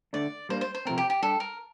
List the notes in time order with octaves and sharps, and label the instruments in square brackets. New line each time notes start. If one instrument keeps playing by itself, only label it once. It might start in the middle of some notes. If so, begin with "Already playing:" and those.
[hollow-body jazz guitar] D3 A3 D4 [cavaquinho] D5
[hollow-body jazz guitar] G3 A#3 D4 [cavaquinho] C5
[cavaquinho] C5
C5
[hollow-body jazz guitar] C3 F3 A3 C4 [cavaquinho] A#4
[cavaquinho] G4
G4
[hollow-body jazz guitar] G3 D4 G4 [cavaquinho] A4
[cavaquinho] A#4